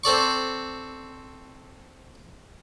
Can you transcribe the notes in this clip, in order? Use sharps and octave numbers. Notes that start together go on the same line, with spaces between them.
C4 A4 D5 C#6